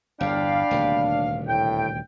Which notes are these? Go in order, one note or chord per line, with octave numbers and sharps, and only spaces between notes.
G1 E2 D4 D5 F5 G5 B5
D#1 D2 C3
A2 G5